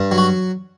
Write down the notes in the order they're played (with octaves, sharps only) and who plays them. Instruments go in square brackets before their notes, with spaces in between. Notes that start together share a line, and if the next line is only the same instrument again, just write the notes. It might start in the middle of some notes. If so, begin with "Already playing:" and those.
Already playing: [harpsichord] G2
F#3
F#4